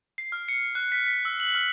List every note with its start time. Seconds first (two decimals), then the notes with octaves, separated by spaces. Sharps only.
0.18 C7
0.32 F6
0.48 C#7
0.75 F#6
0.92 B6
1.06 B6
1.25 E6
1.40 F#7
1.55 F6